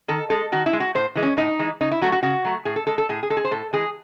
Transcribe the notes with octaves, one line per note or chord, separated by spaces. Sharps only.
D#3 A4
G#3 A4
D#3 F#4
E4
G#3
F#4
A2 C5
E3 G#3
C#4
A2 D#4
E3 G#3
C#3 D#4
E4
F#3 A3 F#4
F#4
C#3 F#4
F#3 A3
A2 G#4
A4
G#3 A4
A4
A2 G#4
G#4
G#3 A4
G#4
C5
A2 A4
E3 G#3 G#4